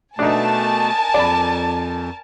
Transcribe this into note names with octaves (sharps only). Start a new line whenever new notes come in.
B2 A3 D4 D#4 A#4 G#5 A5
F2 D5 B5